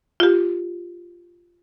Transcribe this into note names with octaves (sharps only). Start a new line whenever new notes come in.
F4 G4